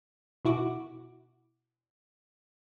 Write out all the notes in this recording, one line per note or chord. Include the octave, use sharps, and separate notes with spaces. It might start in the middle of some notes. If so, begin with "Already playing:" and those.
B2 E4 F#4 D6